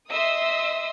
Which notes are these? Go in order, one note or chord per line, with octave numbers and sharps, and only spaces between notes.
D#5 E5 C6 D#6 E6